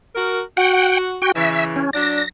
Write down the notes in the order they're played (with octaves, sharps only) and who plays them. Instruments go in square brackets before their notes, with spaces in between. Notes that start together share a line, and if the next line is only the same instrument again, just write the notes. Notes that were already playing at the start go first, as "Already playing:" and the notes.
[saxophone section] F#4 A#4
[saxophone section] F#4 [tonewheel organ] F#5 G5
[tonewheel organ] F#4 G5
[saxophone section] C#3 E3 [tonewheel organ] E5
[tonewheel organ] C#4
[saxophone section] F#3 D4 [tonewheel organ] A#6